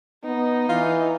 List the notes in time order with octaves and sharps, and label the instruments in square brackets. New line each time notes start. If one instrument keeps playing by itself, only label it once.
[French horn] B3 [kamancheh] D#4
[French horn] E3 [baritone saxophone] F4